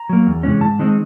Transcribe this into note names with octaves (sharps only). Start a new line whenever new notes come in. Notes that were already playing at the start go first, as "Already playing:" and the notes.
Already playing: A#5
F#3 A#3
E2
C3 E3 G#3 C#4
G#2 A5
D#3 G#3 C4 D#4